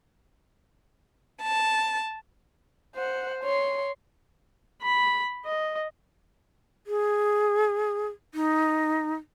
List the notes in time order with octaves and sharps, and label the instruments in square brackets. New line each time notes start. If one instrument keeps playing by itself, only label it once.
[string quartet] A5
[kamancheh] C5 F#5
C#5 C6
[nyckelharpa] B5
D#5
[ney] G#4
D#4